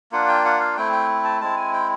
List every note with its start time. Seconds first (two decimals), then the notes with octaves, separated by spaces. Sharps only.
0.12 A#3 D4 F4 F#5
0.28 G5
0.45 F#5
0.60 F5
0.77 A3 C4 E4 G5
0.92 G5
1.24 A5
1.41 G#3 C4 E4 A5
1.57 G#5
1.73 G5